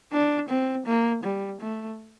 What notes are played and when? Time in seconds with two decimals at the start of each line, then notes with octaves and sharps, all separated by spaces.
0.13 D4
0.49 C4
0.86 A#3
1.24 G3
1.61 A3